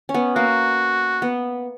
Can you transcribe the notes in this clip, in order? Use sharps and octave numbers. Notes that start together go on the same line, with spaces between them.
C#4
B3
A#3 F#4
B3